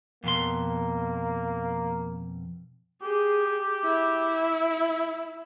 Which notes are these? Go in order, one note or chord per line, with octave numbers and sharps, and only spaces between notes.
F2 B2 A#3 C6
G4 G#4
E4